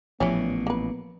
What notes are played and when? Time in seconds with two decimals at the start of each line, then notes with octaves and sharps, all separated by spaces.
0.20 A1 A#2 E3 F3 G3 B3 C#4
0.67 A#3 B4